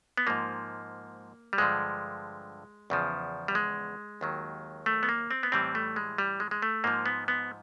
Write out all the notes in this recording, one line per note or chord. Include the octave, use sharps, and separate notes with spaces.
B3
G#2 F3 A#3
G3
G2 D3 F3 G#3
E2 C#3 F3
G3
G#3
D#2 D#3 F#3
A3
B3
A#3
C4
B3
A2 E3 G3 C4
A3
G#3
G3
G#3
G#3
A3
G#2 F3 A#3
B3
B3